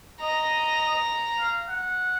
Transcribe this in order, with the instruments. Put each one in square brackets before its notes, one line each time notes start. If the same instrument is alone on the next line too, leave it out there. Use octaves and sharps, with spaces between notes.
[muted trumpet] D#5 [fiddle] A#5
[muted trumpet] F5
F#5